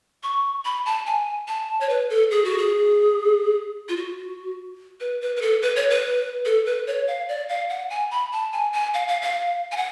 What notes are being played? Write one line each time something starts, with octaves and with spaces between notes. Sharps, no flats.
C#6
B5
A5
G#5
A5
C#5
B4
A4
G#4
F#4
G#4
F4
F#4
B4
B4
B4
A4
B4
C#5
B4
A4
B4
C#5
F5
D5
F5
F#5
G#5
B5
A5
G#5
G#5
F5
F5
F5
G#5
F#5